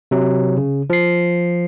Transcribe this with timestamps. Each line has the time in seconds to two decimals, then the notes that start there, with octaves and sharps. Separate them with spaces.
0.11 C3 F#3
0.57 C#3
0.90 F3 C7